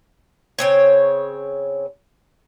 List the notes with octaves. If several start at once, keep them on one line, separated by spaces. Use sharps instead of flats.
C#3 C4 C#5